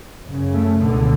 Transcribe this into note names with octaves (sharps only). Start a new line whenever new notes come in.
F#2 C#3
A3
C#2 B2 D3